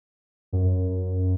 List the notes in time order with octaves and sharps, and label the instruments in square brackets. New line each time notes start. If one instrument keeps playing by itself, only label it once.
[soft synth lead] F#2